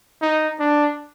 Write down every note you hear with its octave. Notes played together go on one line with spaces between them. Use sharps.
D#4
D4